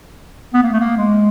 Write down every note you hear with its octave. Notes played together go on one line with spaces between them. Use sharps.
B3
A#3
A3
A#3
G#3